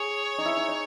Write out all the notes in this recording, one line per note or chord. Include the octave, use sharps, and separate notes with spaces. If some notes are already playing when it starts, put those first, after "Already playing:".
Already playing: G#4 C#5
D#4
E4
D#4
D#4